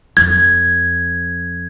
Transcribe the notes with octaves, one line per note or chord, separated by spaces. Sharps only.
F2 G#6